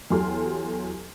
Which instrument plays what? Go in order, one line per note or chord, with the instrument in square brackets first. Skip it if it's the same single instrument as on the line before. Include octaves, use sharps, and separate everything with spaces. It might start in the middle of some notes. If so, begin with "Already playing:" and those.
[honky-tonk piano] E2 F#3 G4 A4 C6 F6